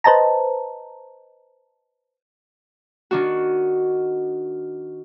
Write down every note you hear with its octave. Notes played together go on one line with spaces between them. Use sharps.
B4 C5 D#5 A5 A#5
D#3 D4 F#4